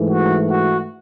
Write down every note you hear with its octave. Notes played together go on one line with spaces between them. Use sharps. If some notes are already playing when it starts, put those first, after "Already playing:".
Already playing: G#2 E3 A3
F#4
F#4